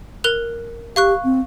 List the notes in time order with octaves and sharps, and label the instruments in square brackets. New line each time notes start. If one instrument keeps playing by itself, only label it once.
[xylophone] A#4 F#6 F7
[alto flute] G4 [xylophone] F5 C#6 F#6
[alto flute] C4